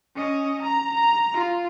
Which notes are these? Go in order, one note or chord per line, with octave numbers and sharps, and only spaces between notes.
C#4 D#5
A#5
A#5
F4